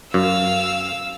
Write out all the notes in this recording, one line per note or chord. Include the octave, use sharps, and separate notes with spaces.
F#2 F5 E6